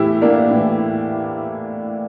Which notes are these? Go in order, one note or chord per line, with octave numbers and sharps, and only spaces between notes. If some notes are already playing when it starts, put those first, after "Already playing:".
Already playing: A2 E3 E4 G4
A#3 D4
A2 E3